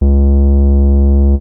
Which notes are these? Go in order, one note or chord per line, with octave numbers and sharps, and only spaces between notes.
C#2